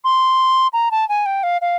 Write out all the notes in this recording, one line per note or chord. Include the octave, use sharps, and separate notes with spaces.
C6
A#5
A5
G#5
G5
F5
F5